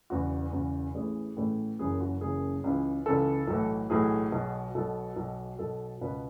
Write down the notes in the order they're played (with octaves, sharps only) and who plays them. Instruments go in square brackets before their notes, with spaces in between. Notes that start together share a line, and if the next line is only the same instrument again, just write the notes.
[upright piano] E1 E2 C#3 E3 F#4
E1 E2 C#3 E3
A1 A2 E3 G#4
A1 A2 E3
F#1 F#2 C#3 E3 G#4
F#4
F#1 F#2 C#3 E3 G#4
C#2 C#3 E3
C#2 C#3 E3 A4
B1 A2 E3
B1 A2 E3 G#4
B1 B2
B1 B2 A4
B1 B2
B1 B2 A4
C#2 B2 B4